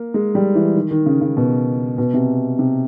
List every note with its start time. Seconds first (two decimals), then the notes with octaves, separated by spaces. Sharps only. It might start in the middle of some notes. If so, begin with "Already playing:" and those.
Already playing: A#3
0.14 G#3
0.35 G3
0.55 E3
0.75 D#3
0.91 D#3
1.06 C#3
1.21 C#3
1.37 B2
1.98 B2
2.14 C3
2.59 C3